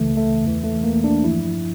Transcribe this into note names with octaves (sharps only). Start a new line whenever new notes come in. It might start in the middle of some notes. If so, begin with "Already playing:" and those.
Already playing: C#2 C#3 E3 A3
A3
E2 E3
A3
A#3
D4
G2 F3 E4